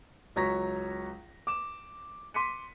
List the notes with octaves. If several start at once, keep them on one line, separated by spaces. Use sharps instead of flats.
C#2 F#3 C#5 A#5 A#6 B6
D6 E7
C6 D6 B6 C#7 D#7